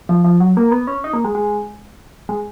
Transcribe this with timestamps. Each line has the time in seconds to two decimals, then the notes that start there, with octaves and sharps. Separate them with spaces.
0.09 F3
0.24 F3
0.40 F#3
0.57 A#3
0.71 B3
0.87 C#4
1.04 D#4
1.13 A#3
1.24 G#3
1.35 G#3
2.29 G#3